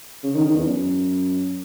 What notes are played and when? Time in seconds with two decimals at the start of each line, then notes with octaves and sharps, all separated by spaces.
0.23 C#3
0.34 D#3
0.45 D#3
0.56 E2
0.66 F#2